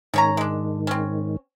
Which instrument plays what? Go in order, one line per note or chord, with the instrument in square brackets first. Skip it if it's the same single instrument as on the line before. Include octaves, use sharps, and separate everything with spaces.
[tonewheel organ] G#2 D#3 [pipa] C#4 C#5 A#5
[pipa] G#3 D4
C4 C#4